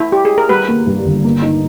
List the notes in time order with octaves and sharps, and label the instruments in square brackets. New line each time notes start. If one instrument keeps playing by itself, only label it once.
[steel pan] E4
G4
G#4
A#4
[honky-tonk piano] G3 [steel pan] B4
[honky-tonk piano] A#3
G2
G1
A#3
D#4